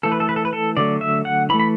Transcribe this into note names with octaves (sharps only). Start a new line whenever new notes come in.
E3 A3 A4
B4
A4
B4
A4
B4
A4
D3 F#3 A3 D5
E5
F#5
E3 A3 B5
B5